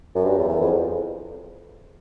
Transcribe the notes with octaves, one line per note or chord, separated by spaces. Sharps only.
F#2
G2
E2
E2
F2